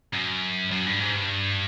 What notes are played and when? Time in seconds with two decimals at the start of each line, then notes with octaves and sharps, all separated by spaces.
0.13 F#2
0.71 F#2
0.86 G2
1.00 G#2
1.14 G2